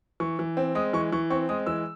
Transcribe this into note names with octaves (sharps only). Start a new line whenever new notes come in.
E3 C#6
E3
C4
G#3 D#6
E3 C#6
E3 C#6
C4 C#6
G#3 D#6
E3 E6